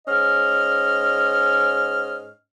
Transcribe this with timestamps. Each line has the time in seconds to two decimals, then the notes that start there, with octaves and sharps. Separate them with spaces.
0.07 G#2 C#4 D#5 F6